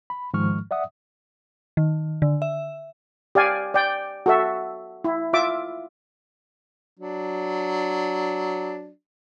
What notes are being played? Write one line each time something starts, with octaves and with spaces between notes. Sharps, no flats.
B5
G#2 D#3 F3 G#3 C#6 F6
D5 E5 F#5 D#6
D#3
D3
E5
G4 D5 F5 G#5
D5 G5
F#4 A4 E5
E4
F4 E5 D6
F#3 D4